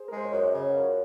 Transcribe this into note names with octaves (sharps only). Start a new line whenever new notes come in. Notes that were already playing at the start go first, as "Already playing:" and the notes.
Already playing: G#4 C5
A#4
G#3 C5
C#5
F#2 C5 D#5
C#3
F#5
F#2 C#5 F5